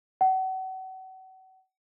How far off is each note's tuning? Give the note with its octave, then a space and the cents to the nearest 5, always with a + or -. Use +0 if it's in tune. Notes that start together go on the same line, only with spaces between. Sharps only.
F#5 +35